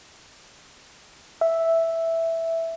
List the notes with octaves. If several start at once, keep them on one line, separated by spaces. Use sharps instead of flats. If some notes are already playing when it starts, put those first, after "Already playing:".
E5